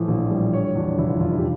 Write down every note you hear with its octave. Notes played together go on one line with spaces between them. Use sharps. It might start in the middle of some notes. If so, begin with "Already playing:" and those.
Already playing: A2 E3 F3
A#1
G3
D3 C#5
C#5
E2 D4
F1 E4
F4
F1 F4
E4
G4